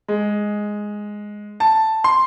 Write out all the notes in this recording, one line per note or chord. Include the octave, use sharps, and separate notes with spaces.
G#3
A5
C6